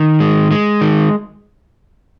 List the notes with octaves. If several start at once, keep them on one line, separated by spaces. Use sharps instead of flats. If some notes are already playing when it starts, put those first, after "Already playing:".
Already playing: D#3
G#3
G#3
D#3